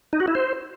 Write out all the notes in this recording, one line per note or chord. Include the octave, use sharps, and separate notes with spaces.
D#4
F#4
E4
C5